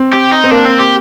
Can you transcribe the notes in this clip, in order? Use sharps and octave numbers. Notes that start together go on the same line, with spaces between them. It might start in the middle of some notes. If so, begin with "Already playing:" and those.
Already playing: C4
G4
D#4
C4
A#3 D4
C4
G4